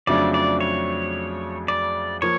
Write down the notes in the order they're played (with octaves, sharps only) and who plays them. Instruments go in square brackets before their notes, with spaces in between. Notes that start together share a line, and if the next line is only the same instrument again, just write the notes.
[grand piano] F2 C#3 F#3 A3 D4 [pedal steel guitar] D5
[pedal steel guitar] D5
C#5
D5
[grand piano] F3 A#3 [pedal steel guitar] C#5